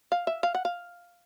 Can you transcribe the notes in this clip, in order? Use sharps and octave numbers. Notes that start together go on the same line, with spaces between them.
F5
E5
F5
F#5
F5